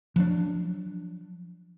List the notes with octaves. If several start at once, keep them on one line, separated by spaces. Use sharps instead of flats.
F3 F#3 B3 D4